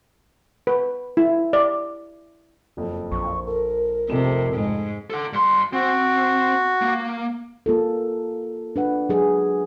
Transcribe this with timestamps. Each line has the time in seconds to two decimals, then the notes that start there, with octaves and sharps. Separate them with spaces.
0.67 B4
1.17 E4
1.53 D5
2.77 F#1 F2
3.12 A#1 C#6
3.47 A4 A#4
4.10 F1 F2 C3 E7
4.53 G#2 G#3
5.10 A4 F#5
5.33 G2 C6
5.73 C4 F#4
6.82 A#3
7.66 A#3 F4 A4
8.76 D4 B4 F#5
9.09 F#3 G#4